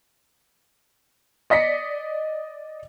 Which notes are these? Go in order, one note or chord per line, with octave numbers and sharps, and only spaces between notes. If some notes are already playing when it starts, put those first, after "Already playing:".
D5 D#5 A#6 B6 C#7